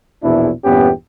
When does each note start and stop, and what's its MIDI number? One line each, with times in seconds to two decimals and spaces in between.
0.23 0.50 34
0.23 0.50 40
0.23 0.50 47
0.23 0.50 62
0.23 0.50 64
0.65 0.90 40
0.65 0.90 43
0.65 0.90 46
0.65 0.90 59
0.65 0.90 61
0.65 0.90 67